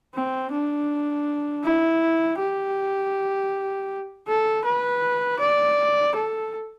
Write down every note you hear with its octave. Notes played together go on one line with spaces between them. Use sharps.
C4
D4
E4
G4
A4
B4
D5
A4